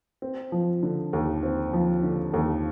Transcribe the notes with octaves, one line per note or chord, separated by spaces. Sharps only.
C4
F3
D3
D#2
C4
F3
D3
D#2